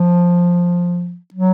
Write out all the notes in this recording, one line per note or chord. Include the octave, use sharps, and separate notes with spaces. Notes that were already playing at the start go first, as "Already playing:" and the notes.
Already playing: F3
F#3